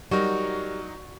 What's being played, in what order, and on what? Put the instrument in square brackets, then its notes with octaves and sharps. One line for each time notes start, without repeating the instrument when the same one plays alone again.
[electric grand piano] F#3 D#4 A#4 [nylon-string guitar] G3 [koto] F#4